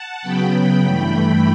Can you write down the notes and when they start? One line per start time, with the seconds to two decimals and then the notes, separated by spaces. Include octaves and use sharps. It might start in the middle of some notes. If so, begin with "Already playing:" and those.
Already playing: F#5 A5
0.22 C#3 F#3 B3 G5 B5
0.82 G2 E3 A3